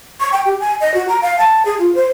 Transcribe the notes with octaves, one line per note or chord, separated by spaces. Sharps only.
C#6
G5
G4
G#5
D#5
F#4
A#5
F5
A5
G#4
F4
C5